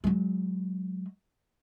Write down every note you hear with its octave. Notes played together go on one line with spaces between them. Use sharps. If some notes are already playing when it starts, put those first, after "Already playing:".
F#3 G#3